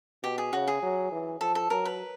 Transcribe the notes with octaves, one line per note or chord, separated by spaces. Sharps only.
B2 G4
G#4
C#3 F#4
G#4
F#3
E3
F3 A4
A4
F#3 A#4
B4